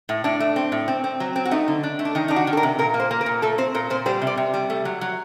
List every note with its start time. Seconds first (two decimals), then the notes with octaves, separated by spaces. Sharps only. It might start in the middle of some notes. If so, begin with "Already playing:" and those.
0.09 A2
0.24 A2 D4
0.40 A3
0.56 C4
0.72 A2
0.88 C4
1.04 C4
1.20 F#3
1.36 C4
1.45 F#4
1.51 A3 D#4
1.68 D3
1.83 D4
1.99 A3
2.05 D4
2.15 D#3 D#4
2.28 D4 D#4
2.36 F#4
2.47 D#3
2.53 A4
2.57 A#4
2.63 C3
2.79 A#2 A#4
2.94 A#3
3.00 C5
3.11 A#3
3.21 A#4
3.26 A#2
3.42 A3 A4
3.58 C4 C5
3.75 A#2 A#4
3.90 A#2 C5
4.06 G3 C5
4.21 C3
4.27 D5
4.37 C3
4.54 G3
4.70 A3
4.85 F#3
5.01 F#3